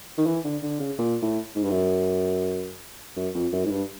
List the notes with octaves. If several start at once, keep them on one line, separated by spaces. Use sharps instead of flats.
D#3
E3
D3
D3
C#3
A#2
A2
G#2
G2
F#2
F#2
F2
F#2
G#2
G2